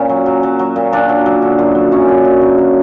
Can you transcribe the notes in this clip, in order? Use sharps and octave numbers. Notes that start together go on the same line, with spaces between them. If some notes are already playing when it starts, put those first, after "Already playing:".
Already playing: A#2 C#4
F#3
F#3
F#3
F#3
A#2
A#2 D4
F#3
F#3
D3
F#2
F#3
F#2 C#4
D3
F#2
F#3
F#3